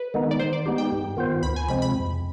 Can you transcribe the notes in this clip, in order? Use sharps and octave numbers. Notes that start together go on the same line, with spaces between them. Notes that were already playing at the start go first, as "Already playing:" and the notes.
Already playing: B4
D#3 G#3 B3 D#4
D5
D#3 C5
D5
G#3 B3 D#4 G4
G5
G2
D#3 B3 F4 C5
D2 B5
G#5
C3 F3 G#3 C4 B5
B5
F2